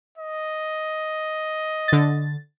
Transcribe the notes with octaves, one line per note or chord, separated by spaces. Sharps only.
D#5
D3 A6